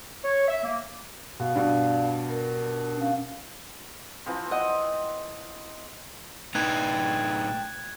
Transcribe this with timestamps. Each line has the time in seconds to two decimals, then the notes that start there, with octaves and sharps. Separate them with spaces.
0.24 C#5
0.48 E5
0.64 A#3
1.40 B2 F5
1.55 G2 B2 D5 F5
2.30 A#4
2.97 C#4 F5
4.26 E3 F3 C4
4.51 D#5 F#5
6.55 A2 D#4 B4 G5 A5 F#6 G#6